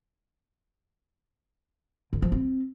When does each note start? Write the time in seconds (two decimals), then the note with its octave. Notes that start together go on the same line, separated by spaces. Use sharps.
2.13 D3
2.22 F3
2.32 C4